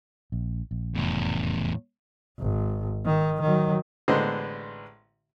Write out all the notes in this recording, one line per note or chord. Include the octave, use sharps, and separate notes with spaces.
A#1
A#1
F1 E2 A2
G#1
D#3
D#3 F#3
A1 D3 G#3 B3 C5 D#5